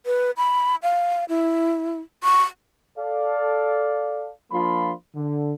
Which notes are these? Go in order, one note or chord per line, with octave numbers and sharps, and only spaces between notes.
B4
B5
F5
E4
C#6
A4 D5 F5
F3 A#3 D4 F4 B5 C6
D3